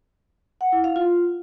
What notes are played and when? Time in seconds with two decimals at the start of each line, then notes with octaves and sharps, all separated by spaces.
0.61 F#5
0.72 E4
0.84 F5
0.96 F4